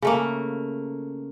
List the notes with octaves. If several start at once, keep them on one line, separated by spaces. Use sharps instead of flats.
C#3 A3 A#3